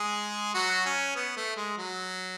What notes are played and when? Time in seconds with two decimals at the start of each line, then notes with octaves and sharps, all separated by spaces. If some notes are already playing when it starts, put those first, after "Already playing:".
Already playing: G#3 G#4
0.54 F#3 F#4
0.86 C#4
1.16 B3
1.37 A3
1.57 G#3
1.78 F#3